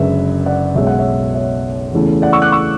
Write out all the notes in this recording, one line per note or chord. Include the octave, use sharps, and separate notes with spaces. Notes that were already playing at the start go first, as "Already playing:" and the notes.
Already playing: F#1 F#2 D3 G#3 G#4 B4 E5
D5 F#5
B1 B2 G#3 C#4 E5
F#5
C#5 E5
C#5 E5
E2 C#3 E3 A3 C#4
D5 F#5
C#6 E6
D6 F#6
C#6 E6